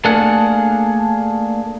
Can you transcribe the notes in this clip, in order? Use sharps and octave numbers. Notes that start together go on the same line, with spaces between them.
A3 A#3 D4 G#4 F#5